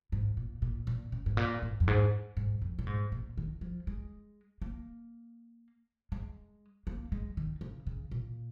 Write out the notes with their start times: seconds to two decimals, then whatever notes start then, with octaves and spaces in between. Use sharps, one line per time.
0.12 G#2
0.37 A#2
0.62 A#2
0.87 A#2
1.12 C#3
1.26 G#2
1.37 A#2
1.62 G#2
1.80 F2
1.87 G#2
2.37 G#2
2.62 F2
2.79 A#2
2.87 G#2
3.12 A#2
3.37 D#3
3.61 F3
3.87 G#3
4.62 A#3
6.12 G#3
6.87 A#3
7.12 G#3
7.37 D#3
7.61 C#3
7.87 C#3
8.11 A#2